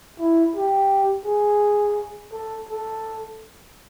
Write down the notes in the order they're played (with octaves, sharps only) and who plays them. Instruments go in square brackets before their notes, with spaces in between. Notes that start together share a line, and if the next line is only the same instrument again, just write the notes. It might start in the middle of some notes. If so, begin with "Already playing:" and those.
[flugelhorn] E4
G4
G#4
A4
A4